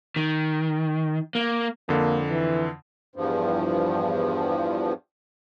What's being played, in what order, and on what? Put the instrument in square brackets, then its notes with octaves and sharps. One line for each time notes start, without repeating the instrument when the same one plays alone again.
[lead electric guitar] D#3
A#3
[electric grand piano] F2 D3 [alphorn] A#3
[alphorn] E3
[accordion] E2 G2 F3